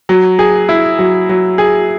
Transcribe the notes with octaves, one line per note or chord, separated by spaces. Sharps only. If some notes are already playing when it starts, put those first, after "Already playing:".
F#3
G#4
E4
F#3
F#3
G#4